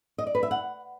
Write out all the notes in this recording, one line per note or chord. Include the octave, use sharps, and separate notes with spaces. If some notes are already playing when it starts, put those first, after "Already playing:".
D#5
D5
B4
E5
F#5